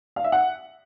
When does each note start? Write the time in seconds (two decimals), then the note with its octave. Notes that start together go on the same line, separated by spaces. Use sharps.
0.16 F5
0.24 E5
0.32 F#5